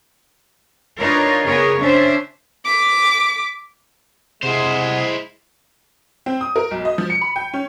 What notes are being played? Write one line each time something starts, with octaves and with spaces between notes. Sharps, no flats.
D4 D#4 F4 A#4 B4 C#5
C#3 B3 G#4 A#4 C#5
C#4 D4 C5 E5
D6 B6
C3 G#3 E4 G#4 C5 F#5 C6 C7
C4
D#6
A#4
B1
D#5
F3
C#7
B5
G5
C#4